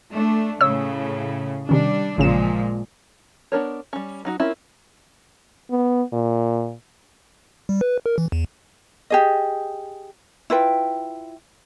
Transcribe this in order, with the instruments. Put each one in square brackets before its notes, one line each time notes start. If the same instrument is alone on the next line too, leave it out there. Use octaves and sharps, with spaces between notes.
[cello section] A3 D4
[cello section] A2 C#3 [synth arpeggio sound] C#5 E6
[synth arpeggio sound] C3 D#3 C#4 [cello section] G3 D4
[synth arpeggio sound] A1 C#3 E7 [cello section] A#2 F3 G#3
[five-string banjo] B3 D4 A#4 C#5
G3 C#4
F#3 D#4 F#4
C4 C#4 E4 F4 A#4
[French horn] B3
A#2
[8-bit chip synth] G3
B4
A#4
E3
E2
[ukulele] G4 G#4 D#5
E4 F4 B4 G5